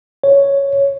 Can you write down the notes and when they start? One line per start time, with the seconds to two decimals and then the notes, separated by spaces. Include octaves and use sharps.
0.24 C#5